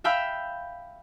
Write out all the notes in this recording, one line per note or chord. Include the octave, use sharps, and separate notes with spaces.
E5 F5 G5 B5 E6